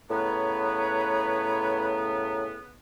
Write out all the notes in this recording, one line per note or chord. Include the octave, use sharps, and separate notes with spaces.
A2 C#3 B3 B4 C#5 A#5